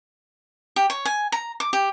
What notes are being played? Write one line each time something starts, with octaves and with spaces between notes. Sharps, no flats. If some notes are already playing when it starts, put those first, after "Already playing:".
G4
C#5
G#5
A#5
D6
G4